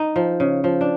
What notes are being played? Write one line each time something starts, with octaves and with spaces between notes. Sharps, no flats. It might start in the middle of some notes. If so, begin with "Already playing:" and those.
Already playing: D#4
F3
C#3
F3
D4